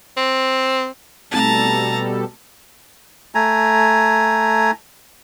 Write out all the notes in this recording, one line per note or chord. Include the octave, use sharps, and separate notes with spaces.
C4
B2 G3 A3 C4 A4 A5 A#5 B6
A3 G#5 A#5